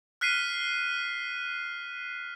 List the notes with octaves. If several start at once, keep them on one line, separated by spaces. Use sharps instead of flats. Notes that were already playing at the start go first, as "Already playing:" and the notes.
F6 F#6 B6 C7 D#7